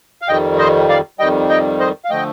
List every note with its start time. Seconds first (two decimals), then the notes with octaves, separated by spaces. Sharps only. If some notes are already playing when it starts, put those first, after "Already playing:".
0.22 F5
0.28 F2 D#3 G3 D#5 G5
0.59 C5 D#5
0.89 D5 F5
1.19 F2 D#3 G3 D#5 G5
1.49 D#5 G5
1.80 C5 D#5
2.05 F5
2.10 D3 F3 A3 D#5 G5